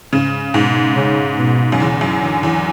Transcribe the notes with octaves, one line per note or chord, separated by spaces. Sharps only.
G#2 C#3
G#2 B2
C#3
B2
F#2
E2 C#3
F#2
E2 D3
E2